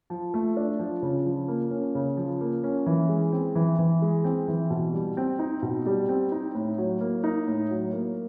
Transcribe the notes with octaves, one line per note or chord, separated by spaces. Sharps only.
F3
A3
D4
F3
C#3
F3
A#3
C#4
C#3
F3
A#3
C#4
E3
G#3
C4
E3
E3
G#3
C4
E3
B2
G3
C4
D#4
B2
G3
C4
D#4
A2
F#3
A#3
D#4
A2
F#3
A#3